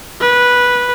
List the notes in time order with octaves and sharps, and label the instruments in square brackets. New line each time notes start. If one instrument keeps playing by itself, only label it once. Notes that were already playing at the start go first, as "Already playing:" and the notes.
[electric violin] B4